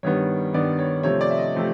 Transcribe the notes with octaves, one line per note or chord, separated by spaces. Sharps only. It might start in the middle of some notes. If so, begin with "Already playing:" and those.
G2 D#3 G3 B3 C#5
G2 D#3 G3 B3 D5
C#5
C3 F3 A3 C4 C#5
D5
E5
D#5
C3 F3 A3 C4